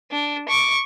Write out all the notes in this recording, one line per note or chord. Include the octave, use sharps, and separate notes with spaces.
D4
C#6 D6